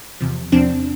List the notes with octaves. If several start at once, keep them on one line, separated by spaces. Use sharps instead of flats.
E2 C3 F3
E2 C3 F3 C4 D4